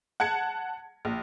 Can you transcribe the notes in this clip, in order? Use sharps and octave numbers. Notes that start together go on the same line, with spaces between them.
F#5 A5 G#6 C#7
A#1